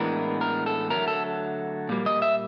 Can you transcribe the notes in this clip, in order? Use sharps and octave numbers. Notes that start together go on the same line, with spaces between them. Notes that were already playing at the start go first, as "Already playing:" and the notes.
Already playing: A2 E3 G#3 B3 D4 A#4
A#4
A4
D3 F#3 A3 A#4
A4
A#2 G3 A#3
D#5
E5